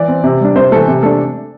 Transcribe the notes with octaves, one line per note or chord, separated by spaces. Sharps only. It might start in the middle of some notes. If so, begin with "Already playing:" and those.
Already playing: E3 D5
C4
C3
G3 D4
C3 C5
E3 A3 A4
C3
A3 D4 A4